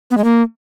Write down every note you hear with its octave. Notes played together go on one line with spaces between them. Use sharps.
B3
G#3
A#3